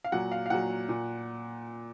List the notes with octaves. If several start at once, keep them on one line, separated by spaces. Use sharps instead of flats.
F5
A#2 F#3 F#5
F5
F5
A#2 F#3 F#5
A#2